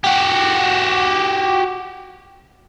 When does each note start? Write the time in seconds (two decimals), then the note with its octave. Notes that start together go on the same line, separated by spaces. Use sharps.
0.04 F#4 G4